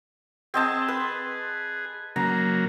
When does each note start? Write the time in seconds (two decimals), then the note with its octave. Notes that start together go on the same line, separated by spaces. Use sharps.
0.54 C4 G#4 D#5 A5
0.88 B4
2.16 C#3 F#3 A#3 A#5